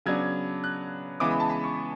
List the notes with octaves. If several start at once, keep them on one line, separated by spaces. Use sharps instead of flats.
C#3 F#3 B3 D4 G#6
F#6
C#3 E3 G#3 B3 E4 D6
B5
A5
B5
C#6